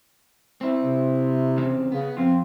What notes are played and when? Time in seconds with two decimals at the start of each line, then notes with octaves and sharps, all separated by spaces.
0.61 C4 E4
0.82 C3
1.57 E2 C#3 C4
1.92 C#3 B3
2.17 F2 C4 F4